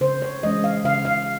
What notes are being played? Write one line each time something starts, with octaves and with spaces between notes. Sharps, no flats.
C#3 C5
C#5
E3 G#3 C#4 D#5
F5
C#3 F5
F5